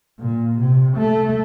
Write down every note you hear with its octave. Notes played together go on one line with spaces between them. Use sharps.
A#2
C3
A3